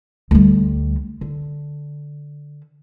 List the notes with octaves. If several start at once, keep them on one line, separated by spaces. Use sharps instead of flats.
D2 G3
D3